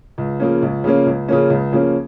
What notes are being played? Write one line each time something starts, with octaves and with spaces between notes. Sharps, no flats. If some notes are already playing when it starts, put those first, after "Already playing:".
C#2
C#3 F3 A#3 C#4
C#2
C#3 F3 A#3 C#4
C#2
C#3 F3 A#3 C#4
C#2
C#3 F3 A#3 C#4